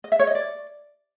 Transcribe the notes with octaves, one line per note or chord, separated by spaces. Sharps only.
D#5
E5
C#5
D#5
D5